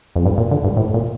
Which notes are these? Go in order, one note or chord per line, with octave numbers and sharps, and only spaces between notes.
F2
G2
A#2
D3
G2
A2
A#2